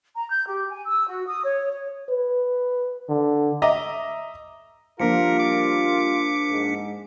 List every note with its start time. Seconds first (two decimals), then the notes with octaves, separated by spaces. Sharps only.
0.14 A#5
0.29 G6
0.45 G4
0.71 G#5
0.85 E6
1.06 F#4
1.28 D#6
1.44 C#5
1.71 C#5
2.09 B4
3.09 D3
3.62 D#5 E5 A#5 D6
5.00 F3 G3 A#3 D4 F4 A#4 B6 C#7
5.40 D6
6.51 G#2